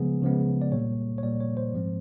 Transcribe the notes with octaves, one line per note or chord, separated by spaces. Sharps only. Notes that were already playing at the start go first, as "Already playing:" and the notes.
Already playing: C#3 F3 G#3 B3 G#4
C#3 F3 G#3 B3
D5
A#2 G3 A#3 C#5
C#5
A#2 G3 A#3 D5
C#5
C5
G#2 F3 G#3 C4